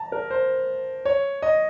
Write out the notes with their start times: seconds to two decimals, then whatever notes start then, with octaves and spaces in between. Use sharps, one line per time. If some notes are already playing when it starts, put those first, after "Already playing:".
Already playing: A5 A#5
0.12 A#4
0.31 C5
1.05 C#5
1.42 D#5